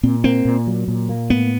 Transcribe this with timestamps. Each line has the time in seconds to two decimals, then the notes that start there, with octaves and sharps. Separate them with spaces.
0.03 A#2 C4
0.24 A#3 C4
0.45 A#2
0.67 F#3
0.88 A#2
1.09 A#3
1.30 A2 B3